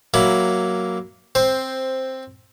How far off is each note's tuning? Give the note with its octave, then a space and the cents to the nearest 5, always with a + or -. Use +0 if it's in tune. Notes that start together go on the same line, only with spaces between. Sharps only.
F#3 +0 A#3 +0 E4 +0
C4 +5 C5 +0